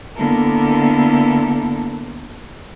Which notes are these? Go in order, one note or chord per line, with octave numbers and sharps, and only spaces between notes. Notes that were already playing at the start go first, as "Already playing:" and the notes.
D3 A#3 B3 E4 A4 A#4